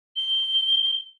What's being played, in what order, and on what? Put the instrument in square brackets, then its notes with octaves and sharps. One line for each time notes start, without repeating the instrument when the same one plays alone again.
[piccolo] G7